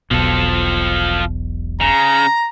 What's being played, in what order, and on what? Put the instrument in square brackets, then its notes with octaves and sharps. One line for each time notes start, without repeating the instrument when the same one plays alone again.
[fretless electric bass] E1 B1 B2 [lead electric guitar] F3 A4
[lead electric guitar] C#3 [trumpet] A#5